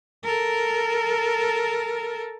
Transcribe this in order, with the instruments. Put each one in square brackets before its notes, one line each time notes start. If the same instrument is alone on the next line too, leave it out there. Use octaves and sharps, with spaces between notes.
[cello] A4 A#4